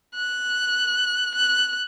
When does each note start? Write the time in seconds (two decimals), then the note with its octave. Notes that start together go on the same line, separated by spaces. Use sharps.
0.15 F#6
1.35 F#6